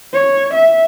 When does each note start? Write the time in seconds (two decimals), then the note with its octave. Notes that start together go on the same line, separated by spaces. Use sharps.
0.14 C#5
0.54 E5